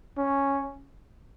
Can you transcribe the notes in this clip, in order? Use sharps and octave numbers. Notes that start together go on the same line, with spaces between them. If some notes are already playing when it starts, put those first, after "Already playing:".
C#4